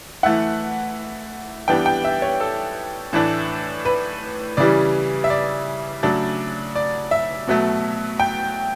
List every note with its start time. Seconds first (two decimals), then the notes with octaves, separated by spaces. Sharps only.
0.23 E3 A3 E4 F#5
1.68 E3 G3 B3 D4 G5
1.86 G5
2.04 E5
2.22 C#5
2.41 A4
3.13 A2 E3 A3 D4
3.85 B4
4.57 C#3 E3 G3 D5
5.24 E5
5.30 D5
6.03 C#3 F#3 A3 D4
6.76 D5
7.11 E5
7.47 B2 F#3 A3
8.20 G5